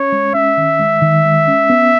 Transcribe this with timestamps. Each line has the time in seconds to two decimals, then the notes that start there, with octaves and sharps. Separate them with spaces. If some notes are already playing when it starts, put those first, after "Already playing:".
Already playing: C#4 C#5
0.12 G#3
0.35 C#4 E5
0.57 D#3
0.80 G#3
1.02 D#3
1.25 G#3
1.47 C#4
1.70 B3